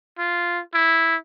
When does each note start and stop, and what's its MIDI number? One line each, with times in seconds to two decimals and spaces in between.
0.19 0.60 65
0.74 1.16 64